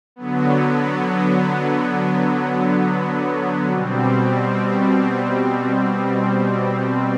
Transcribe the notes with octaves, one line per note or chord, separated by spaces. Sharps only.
D3 F#3 B3
B2 G3 C4